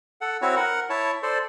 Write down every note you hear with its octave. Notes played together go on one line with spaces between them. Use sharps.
A4 F#5
C4 E4 F#4 C#5
A#4 F#5
E4 C#5 A5
A4 C5 D5